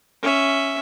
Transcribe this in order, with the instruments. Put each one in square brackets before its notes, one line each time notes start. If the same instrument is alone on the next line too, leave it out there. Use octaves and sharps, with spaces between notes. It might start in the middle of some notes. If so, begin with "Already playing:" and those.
[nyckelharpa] C#4 E5